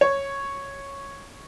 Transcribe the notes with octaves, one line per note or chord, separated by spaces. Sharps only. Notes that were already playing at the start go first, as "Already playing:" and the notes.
C#5